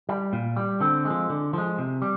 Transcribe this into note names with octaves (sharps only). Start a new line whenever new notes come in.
G3
A#2
G3
D3 C4
G#3
F3
D3
F3 G#3
C3
G3